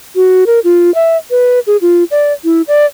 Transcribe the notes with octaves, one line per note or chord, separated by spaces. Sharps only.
F#4
A#4
F4
E5
B4
G#4
F4
D5
E4
D5